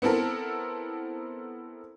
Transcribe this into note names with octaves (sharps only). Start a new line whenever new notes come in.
B3 C4 E4 A4 A#4